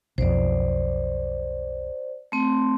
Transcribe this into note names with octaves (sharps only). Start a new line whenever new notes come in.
B1 F2 C5 D5
A3 C4 C6